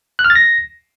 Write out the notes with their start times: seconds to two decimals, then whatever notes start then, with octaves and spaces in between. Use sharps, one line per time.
0.19 F#6
0.24 F6
0.30 A6
0.35 A#6